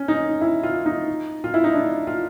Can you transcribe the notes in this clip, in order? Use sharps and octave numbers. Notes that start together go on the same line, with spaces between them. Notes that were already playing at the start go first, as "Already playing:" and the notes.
Already playing: C#4
D#4
E4
F4
D#4
F4
E4
D#4
D4
F4